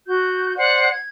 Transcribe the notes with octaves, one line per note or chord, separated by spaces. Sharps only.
F#4 G6
C5 D5 F#5 F#6
G#6